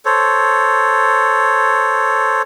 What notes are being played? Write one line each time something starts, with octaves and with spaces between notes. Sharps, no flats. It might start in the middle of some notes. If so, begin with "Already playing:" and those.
A4 C5 C#5